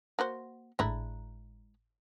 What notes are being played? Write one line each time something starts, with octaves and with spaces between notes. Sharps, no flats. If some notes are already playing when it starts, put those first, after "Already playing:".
A#3 F#4 C5
G#1 A2 G#3 D4 E4 A#5